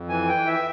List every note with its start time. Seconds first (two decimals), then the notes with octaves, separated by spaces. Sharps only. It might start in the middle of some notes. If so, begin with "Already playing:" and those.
Already playing: F2
0.09 E3 G#5
0.28 G5
0.34 E3
0.47 E5